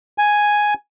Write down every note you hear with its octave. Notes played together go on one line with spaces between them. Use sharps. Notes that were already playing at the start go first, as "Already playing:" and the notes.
G#5